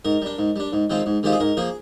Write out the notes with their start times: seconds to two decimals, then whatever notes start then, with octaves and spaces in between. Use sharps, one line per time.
0.05 G#2 A#4
0.22 G3 D4
0.39 G#2
0.56 G3 D4
0.73 G#2
0.90 D#3 G#3 C4 F4
1.06 G#2
1.23 D#3 G#3 C4 F4 G4
1.32 G#4
1.40 G#2 A#4
1.57 F3 A#3 G#4